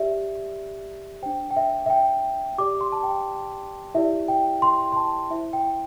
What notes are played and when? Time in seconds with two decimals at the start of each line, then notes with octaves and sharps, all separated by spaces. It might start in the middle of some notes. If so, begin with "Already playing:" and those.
Already playing: G4 D5 E5
1.22 D4 C5 G5
1.51 G5
1.57 E5
1.86 E5
1.90 G5
2.58 G4 D5 D6
2.81 C6
2.92 A5
3.03 G5
3.94 E4 G4 D5 E5
4.28 G5
4.62 C6
4.92 C6
4.96 A5
5.30 E4 C5 E5
5.53 G5